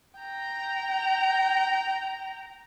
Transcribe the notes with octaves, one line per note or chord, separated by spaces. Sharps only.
G5 A#5